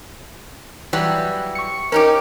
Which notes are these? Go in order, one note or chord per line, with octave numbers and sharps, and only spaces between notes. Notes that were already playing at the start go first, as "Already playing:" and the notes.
E3 F#3 G3
C#6 C#7
C#4 D#4 G4 A#4 D6